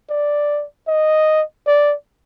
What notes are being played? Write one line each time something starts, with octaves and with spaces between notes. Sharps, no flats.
D5
D#5
D5